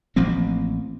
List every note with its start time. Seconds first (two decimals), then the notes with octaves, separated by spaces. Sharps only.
0.16 A1 F3 A#3 C4